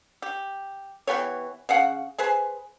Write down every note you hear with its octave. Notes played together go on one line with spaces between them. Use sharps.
G4
E3 B3 G4 C#5
C#3 F5 F#5
G#4 B4 C5 G#5